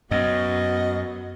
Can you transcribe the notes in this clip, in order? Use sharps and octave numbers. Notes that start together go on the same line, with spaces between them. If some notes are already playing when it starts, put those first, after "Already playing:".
F#2 B3 F#4 D#5